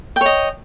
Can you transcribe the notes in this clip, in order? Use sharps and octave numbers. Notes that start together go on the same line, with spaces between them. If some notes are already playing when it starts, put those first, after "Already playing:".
C#5 D#5 G5